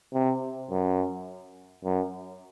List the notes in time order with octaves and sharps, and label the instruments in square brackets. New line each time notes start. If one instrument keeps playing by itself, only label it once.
[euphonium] C3
F#2
F#2